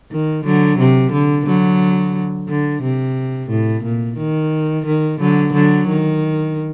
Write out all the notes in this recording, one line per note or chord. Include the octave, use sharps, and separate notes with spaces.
D#3
D3 F#3
C3
D3
D3 F#3
D3
C3
A2
A#2
D#3
D#3
D3 F#3
D3 F#3
D#3